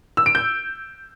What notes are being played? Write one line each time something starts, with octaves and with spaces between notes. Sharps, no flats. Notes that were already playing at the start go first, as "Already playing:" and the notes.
E6
D7
G6